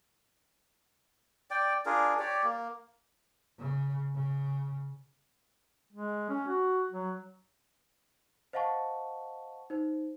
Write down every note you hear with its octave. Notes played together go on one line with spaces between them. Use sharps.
D5 G5
D4 F4 G#4 A#4
G4 C#5 D5
A#3
C#3
C#3
G#3
C#4
F#4
F#3
C5 D#5 F5 F#5 A5 C#6
D#4 C5